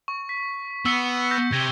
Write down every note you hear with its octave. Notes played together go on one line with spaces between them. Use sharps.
C#6
B6
B3 E6 C#7
E6 G6 A#6
C3 G#6 A#6 G7